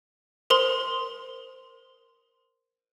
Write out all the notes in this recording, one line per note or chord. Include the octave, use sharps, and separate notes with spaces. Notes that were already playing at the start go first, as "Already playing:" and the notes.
A#4 C5 C6